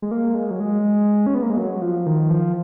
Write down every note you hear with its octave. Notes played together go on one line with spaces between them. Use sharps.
G#3
A#3
G#3
F#3
G#3
C#4
B3
A#3
G#3
F#3
F3
D#3
F3